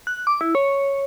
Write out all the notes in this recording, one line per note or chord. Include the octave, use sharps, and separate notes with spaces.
F#6
D6
E4
C#5